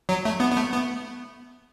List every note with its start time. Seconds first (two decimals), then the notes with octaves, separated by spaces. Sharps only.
0.09 F#3
0.25 A3
0.40 B3
0.52 B3
0.56 A3
0.72 B3